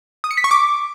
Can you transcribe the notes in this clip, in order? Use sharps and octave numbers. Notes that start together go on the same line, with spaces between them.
D#6
C#7
B6
C#6
D6